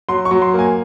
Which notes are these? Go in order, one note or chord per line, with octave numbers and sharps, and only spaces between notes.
F#3 C6
C#6
F#3
C6
A#3 G#5